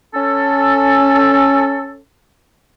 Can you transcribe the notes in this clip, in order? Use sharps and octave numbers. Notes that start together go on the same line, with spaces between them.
C#4 A4